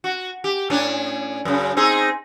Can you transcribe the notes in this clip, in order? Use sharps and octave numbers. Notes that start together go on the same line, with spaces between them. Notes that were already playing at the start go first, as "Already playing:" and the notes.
F#4
G4
A2 C#4 D4
F#2 C#3
C4 D#4 G#4